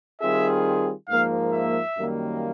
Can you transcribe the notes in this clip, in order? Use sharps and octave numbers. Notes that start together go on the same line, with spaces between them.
D#3 G3 C4 F4 G#4 E5
G#2 F3 A#3 F5
E5
F#2 D#3 G3 A#3